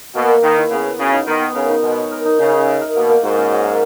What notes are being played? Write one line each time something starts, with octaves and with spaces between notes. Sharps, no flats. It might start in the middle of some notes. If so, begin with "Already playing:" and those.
B2 A#3
A#3
D#3 B4
E4
C#3 B3
B4
C#3 F#4
D#4
D#3 B3
B3
C#3 A#4
D#4
B2 G#3
C#5
A#4
D#4
C#3 D#4
D#4
E5
A#4
B2 A#3
A#3
G#2 F#4
C#4
F#3
A#4